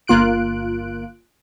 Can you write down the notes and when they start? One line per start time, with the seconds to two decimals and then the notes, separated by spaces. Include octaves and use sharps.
0.07 G1 A#3 F4 F#6 D7